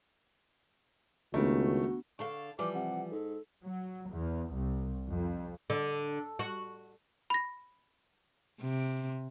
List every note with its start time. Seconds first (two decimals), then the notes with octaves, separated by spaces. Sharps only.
1.34 C#2 D#3 A3 B3 D4 F#4
2.19 D3 A4 F5 C#6
2.59 E3 F3 G3 D6
2.75 C3 F#5
3.11 G#2 A4
3.63 F#3
4.09 E2
4.52 C2
5.11 F2
5.70 D3
6.39 F#4
7.30 B5 A#6
8.61 C3